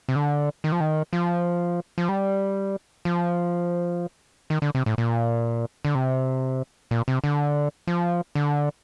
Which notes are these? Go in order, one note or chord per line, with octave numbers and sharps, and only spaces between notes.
C3
D3
D#3
F3
D#3
F3
F3
G3
F3
D#3
D3
C3
A2
A#2
D3
C3
A#2
C3
D3
F3
D3